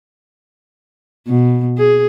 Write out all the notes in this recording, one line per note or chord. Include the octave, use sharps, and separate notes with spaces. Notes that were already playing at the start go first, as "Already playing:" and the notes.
B2
G#4